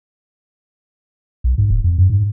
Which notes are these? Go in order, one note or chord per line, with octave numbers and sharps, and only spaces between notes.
B1
G#2
D#1
F2
F#2
G#2